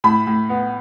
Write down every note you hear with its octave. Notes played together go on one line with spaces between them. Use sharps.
A2 B5
A2
B3